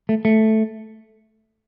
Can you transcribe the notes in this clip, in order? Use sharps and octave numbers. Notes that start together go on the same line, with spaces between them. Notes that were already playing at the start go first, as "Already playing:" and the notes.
A3
A3